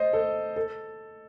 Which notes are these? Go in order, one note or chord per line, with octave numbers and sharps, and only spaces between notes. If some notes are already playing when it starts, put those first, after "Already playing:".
Already playing: C5 D#5
A4
A4